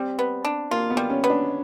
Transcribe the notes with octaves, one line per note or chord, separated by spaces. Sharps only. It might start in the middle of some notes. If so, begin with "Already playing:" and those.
Already playing: G3 C4
B3
D4
A#3 F4
B3
G3
C#4
B3
D4